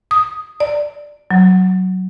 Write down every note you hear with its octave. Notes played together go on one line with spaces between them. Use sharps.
D#6
D5
F#3